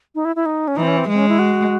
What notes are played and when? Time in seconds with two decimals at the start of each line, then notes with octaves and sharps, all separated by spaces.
0.15 D#4
0.25 E4
0.36 E4
0.46 D#4
0.68 C#4
0.77 E3 D#4
0.83 C4
0.88 C#4
0.97 C4
1.09 G#3
1.14 C4
1.19 C#4
1.29 E4
1.39 F#4